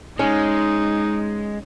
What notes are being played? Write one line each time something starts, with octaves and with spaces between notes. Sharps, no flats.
G#3 C#4 D#4